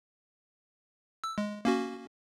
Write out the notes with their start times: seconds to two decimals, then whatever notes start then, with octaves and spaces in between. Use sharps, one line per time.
1.24 E6
1.38 G#3
1.65 A#3 C#4 F#4